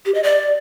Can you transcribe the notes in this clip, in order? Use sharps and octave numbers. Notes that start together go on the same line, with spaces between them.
G4
D#5
D5